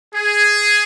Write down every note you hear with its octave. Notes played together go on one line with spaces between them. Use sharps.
G#4